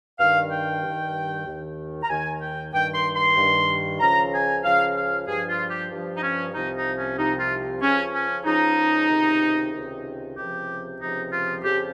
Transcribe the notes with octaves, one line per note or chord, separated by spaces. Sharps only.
G2 D#3 F5
G5
G2 D#3
D#2 D#3
A#5
D#2 D#3 G#5
G5
G2 D#3 G5
C6
C6
G2 D#3
C#2 C#3 F3 A#5
G#5
C#2 C#3 F3 F5
F5
G2 F3 G#4
F4
G4
G2 F3
D#4
C#4
C2 C3 F3 D#4
D#4
C#4
C2 C3 F3 D#4
F4
C#2 C#3 F3 C#4
C#4
C#2 C#3 F3 D#4
C#2 C3 D#3
C#2 C3 D#3
C#2 C3 F3 G4
C#2 C3 F3 D#4
F4
F2 C#3 F3 G4